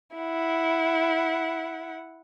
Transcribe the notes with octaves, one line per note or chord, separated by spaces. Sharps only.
E4 F#5